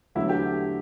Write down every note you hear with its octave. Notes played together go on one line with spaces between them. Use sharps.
E2 D3 F#3 A3 E4
G4